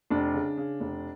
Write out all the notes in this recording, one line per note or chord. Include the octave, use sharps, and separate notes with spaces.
F1 D4
C#3
C#3
F1